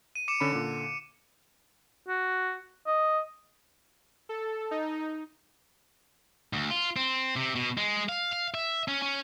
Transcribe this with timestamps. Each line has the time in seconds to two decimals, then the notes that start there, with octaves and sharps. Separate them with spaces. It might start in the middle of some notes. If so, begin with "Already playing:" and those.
0.15 D#7
0.28 D6 C#7 E7
0.40 D3 C#4 B5
0.53 A#2 D3
2.08 F#4
2.87 D#5
4.29 A4
4.71 D#4
6.53 D2
6.70 F4
6.96 C4
7.36 C3
7.55 B2
7.77 G#3
8.09 F5
8.32 F5
8.54 E5
8.88 C#4
9.02 C#4